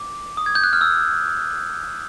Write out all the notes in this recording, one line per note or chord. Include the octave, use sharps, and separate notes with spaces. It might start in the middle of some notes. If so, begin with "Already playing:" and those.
Already playing: D6
D#6
G#6
G6
F#6
F6
E6